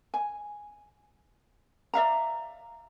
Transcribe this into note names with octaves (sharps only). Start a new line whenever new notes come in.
G#5
D5 E5 F5 A#5